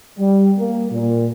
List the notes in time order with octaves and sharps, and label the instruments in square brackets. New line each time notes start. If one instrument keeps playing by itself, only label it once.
[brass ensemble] G3
A#3
A#2